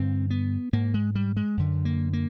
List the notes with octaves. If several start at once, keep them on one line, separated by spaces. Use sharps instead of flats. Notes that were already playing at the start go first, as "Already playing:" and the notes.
Already playing: G2 D3 C4
B3
G#2 A#3
G#3
G3
G#3
F#2 D3
A#3
A#3